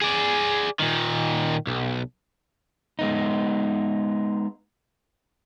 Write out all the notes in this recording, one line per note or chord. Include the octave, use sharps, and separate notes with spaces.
G#4 D5
A#2 D#3
B1
G#3 B3 D#4